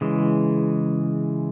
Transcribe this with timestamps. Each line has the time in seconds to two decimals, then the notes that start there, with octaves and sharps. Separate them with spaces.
0.01 C#3 E3 G#3